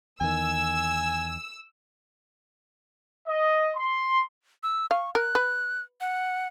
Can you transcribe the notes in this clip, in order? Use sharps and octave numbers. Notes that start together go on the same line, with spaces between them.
E2 D#3 G#5 E6
D#5
C6
E6
F5 C#6
A#4 F#6
B4
F#5